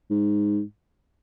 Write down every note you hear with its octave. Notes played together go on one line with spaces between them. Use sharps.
G#2